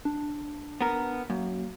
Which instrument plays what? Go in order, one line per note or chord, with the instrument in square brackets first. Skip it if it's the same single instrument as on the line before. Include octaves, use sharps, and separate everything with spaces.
[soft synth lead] D4
[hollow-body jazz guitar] B3 A#4
[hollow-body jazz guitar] F#2 [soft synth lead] A#3